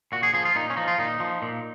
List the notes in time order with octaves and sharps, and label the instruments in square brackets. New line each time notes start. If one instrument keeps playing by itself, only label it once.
[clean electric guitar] A#2 F#4
G#4
F3 G#4
F4
A#2 D#4
C#4
F3 D#4
F4
A#2 D#4
F3
A#2